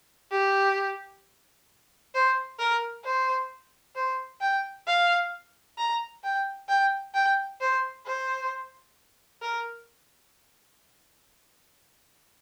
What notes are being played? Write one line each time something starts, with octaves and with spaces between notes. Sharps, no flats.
G4
C5
A#4
C5
C5
G5
F5
A#5
G5
G5
G5
C5
C5
A#4